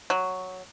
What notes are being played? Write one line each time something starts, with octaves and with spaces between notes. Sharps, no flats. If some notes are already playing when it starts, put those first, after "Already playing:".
F#3